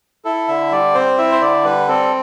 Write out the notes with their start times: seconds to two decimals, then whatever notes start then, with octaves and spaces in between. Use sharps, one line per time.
0.25 E4 A4
0.48 D3 E5
0.72 G3 D5
0.94 C4 C5
1.18 E4 E5
1.32 C5
1.41 D3 D5
1.65 G3 B4
1.88 C4 A4